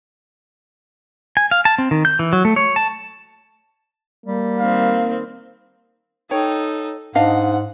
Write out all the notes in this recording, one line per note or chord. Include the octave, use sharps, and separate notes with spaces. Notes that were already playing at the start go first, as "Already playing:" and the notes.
G#5
F5
A5
C4
D#3
G6
E3
F#3
A3
C#5
A5
G3 A#3
D#3 C4 F5
D#4 A4 C#5 G5
G#2 D4 D#5 F5 F#5